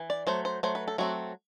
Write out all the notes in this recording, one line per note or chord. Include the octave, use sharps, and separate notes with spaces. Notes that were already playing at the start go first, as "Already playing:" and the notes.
Already playing: E3
D5
F#3 A3 C5
C5
F#3 A3 C5
B4
A4
F#3 A3 C4 F#4